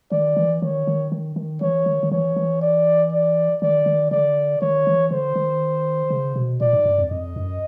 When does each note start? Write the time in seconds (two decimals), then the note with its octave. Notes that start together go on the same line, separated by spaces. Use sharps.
0.11 D#3 D5
0.37 E3
0.62 D#3 C#5
0.87 D#3
1.12 D#3
1.36 D#3
1.61 E3 C#5
1.86 D#3
2.03 D#3
2.11 E3 C#5
2.36 E3
2.62 D5
3.12 D5
3.62 D#3 D5
3.86 D#3
4.11 D3 D5
4.61 D#3 C#5
4.87 E3
5.11 D3 C5
5.36 D#3
6.10 C#3
6.36 B2
6.61 A#2 D5
6.73 G#2
6.86 G2
6.98 F2
7.11 F2 D#5
7.36 F#2